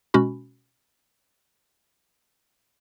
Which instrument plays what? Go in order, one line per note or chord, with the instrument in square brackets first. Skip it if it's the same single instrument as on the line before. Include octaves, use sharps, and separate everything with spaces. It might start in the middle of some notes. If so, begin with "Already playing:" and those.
[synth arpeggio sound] B2 G#3 C#4 F#4 B5